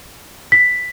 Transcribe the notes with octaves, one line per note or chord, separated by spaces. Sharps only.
B6